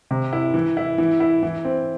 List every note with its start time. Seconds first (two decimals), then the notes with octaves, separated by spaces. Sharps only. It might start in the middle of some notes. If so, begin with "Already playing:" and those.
0.11 C3
0.33 E4
0.54 E3
0.77 E4
0.98 E3
1.20 E4
1.43 E3
1.65 C4